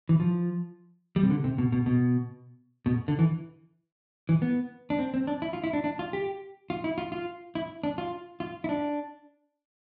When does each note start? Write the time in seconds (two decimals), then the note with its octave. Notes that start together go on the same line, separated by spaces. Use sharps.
0.09 E3
0.20 F3
1.16 G3
1.23 C3
1.30 D3
1.44 C3
1.58 B2
1.72 B2
1.86 B2
2.86 B2
3.08 D3
3.19 E3
4.29 E3
4.42 B3
4.90 D4
4.99 C4
5.14 C4
5.27 D4
5.42 E4
5.53 F4
5.64 E4
5.73 D4
5.84 D4
5.99 F4
6.13 G4
6.70 F4
6.84 E4
6.98 F4
7.12 F4
7.55 E4
7.84 D4
7.98 F4
8.40 F4
8.64 E4
8.69 D4